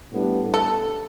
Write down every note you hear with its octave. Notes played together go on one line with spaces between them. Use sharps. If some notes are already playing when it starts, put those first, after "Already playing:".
A2 G3 B3 D4
A4